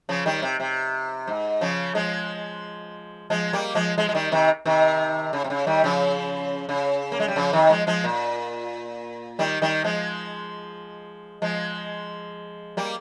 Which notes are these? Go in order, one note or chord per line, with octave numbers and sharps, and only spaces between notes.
C#3 F3
D#3 G3
C3
C3
G#2
C#3 F3
F3 G#3
F3 G#3
G3 A#3
F3 G#3
F3 G#3
G#3
D#3 G3
C3 D#3
C3 D#3
C#3
C3
C#3
D#3 G3
C#3 F3
C#3
A#3
G#3
G3
C#3 F3
C3 D#3
F3 G#3
F3 G#3
A#2
D#3 G3
D#3 G3
F3 G#3
F3 G#3
G3 A#3